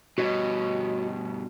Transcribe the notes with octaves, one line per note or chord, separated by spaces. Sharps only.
G2 B2 F#4 C#5 D#5